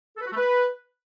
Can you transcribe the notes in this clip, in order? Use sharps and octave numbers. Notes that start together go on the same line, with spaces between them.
A4
B4
F#4
A3
B4